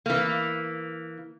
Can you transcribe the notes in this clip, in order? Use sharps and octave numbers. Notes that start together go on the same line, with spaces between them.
E3 A#3